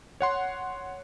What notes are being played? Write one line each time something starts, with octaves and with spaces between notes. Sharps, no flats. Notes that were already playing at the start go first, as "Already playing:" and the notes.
C#5 F#5 C6